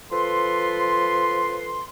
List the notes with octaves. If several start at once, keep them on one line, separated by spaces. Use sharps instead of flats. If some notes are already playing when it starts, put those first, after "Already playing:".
F3 A4 B4 C6